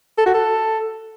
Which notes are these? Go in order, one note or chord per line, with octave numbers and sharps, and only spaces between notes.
A4
F#4
A4